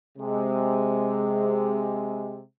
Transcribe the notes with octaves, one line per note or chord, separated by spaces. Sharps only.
C3 G#3